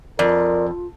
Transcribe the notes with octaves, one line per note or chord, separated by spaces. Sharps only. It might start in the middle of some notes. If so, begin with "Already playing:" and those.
F2 F4 A#4 D5